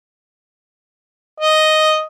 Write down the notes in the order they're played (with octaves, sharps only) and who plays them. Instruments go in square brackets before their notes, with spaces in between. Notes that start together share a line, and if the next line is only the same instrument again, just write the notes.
[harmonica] D#5